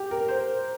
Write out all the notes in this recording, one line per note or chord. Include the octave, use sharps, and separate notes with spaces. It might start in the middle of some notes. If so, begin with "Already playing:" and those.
Already playing: G4
A#4
C5